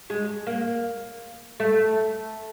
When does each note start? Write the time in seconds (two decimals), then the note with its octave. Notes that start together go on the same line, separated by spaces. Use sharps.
0.10 G#3
0.47 A#3
1.60 A3